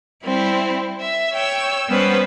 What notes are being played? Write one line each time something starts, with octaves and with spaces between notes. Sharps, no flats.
G3 C4 E4
E5
C#5 G5 E6
G3 B3 C#4 B4 C5